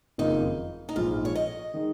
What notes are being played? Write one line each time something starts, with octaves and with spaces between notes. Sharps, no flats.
F#1 F2 D#3 A#3 D#4 F4
D#4
A#1 G#2 F3 F4
C#5
D#5
D#3 G#3 D#4